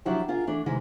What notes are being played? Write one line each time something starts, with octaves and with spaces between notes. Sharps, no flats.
F3 F#3 D4 E4 G4
F4 G#4 A#4
E3 A3 D4
C3 D#3 E3 G#3